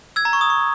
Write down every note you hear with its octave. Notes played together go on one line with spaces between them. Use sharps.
E6 G#6
A#5
C#6
D#6
C#6